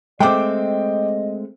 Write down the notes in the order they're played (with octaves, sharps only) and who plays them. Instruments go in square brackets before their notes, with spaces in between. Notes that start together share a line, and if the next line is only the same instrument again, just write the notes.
[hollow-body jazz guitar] G#3 A3 C4 [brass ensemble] D#5 [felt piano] G5 D6